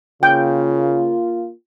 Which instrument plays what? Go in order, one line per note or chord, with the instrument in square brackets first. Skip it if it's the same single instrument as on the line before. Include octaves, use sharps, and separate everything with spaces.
[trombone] C#3 [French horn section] A#3 F4 [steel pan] G5